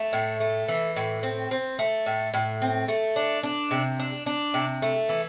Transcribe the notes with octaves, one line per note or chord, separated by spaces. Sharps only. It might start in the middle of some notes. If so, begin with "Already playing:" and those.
Already playing: A3
A2
A3
E3
A2
C4
C4
A3
A2
A2
C4
A3
D4
D4
C3
D4
D4
C3
A3
E3